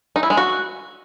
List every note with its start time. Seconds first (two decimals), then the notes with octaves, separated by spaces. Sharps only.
0.16 D#4
0.23 E4
0.30 G#3
0.37 F#4